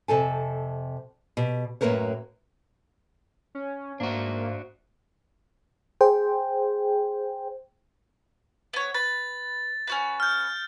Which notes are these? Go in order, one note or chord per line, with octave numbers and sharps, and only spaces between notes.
F2 C3 A4 G#5
B2 G4
F#2 A2 A#3 A#4 B4 C#5
C#4
G#2 A#3 D4 F#4 C5
G#4 C5 G5
B3 C#5
B4 A6
C#4 F#4 B4
F6 G6